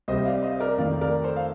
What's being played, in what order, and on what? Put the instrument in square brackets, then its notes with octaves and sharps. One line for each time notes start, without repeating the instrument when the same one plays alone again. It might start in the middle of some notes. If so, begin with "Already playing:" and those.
[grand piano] C2 C3 G3 C5 D#5
D5 F5
C5 D#5
A#4 D5
F2 D#3 A3 D5 F5
A#4 D5
A4 C5
F5